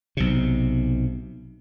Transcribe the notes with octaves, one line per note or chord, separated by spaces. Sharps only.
B1 C3